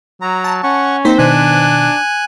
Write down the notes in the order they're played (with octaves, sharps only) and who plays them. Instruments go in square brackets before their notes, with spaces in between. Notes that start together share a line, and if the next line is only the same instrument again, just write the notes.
[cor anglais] F#3 [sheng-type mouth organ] A#5
[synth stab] A5
[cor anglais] C#4 [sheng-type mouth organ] F#5 C#6
[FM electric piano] A#3 [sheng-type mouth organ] C4 [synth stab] D#4 C5 B6
[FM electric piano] B2 D#3 [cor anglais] D4 [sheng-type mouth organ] G#5 F#6